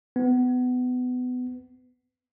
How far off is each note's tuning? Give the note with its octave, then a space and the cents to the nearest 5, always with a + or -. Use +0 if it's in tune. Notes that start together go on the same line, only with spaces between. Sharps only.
B3 +25